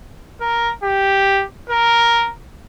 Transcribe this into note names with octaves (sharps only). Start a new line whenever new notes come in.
A#4
G4
A#4